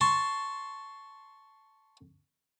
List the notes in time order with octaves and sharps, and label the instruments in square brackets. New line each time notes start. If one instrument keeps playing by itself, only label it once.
[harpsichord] A5 C6 C#6